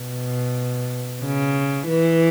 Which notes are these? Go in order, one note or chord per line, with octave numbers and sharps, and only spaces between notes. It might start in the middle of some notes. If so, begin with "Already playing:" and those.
Already playing: B2
C#3
E3